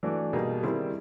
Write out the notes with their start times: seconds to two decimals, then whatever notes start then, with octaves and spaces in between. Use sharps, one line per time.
0.03 E3 A3 D4 F#4
0.33 B2 G3 A#3 D#4 G#4
0.63 D#3 G3 C4 E4 G#4